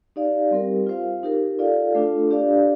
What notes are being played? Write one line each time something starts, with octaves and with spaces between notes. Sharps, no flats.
D#4 G4 D5 F5
G3 C4 G4 A#4
F4 C5 F5
D#4 G4 A#4
F4 A4 D5 F5
A3 D4 F4 A4
D4 G4 D5 F5